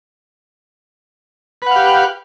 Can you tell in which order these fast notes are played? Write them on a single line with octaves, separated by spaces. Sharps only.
B4 F#5 F5 G4